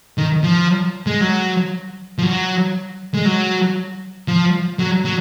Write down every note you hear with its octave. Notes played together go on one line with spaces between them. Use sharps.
D#3
F3
G#3
F#3
F3
F#3
G#3
F#3
F3
F#3
F#3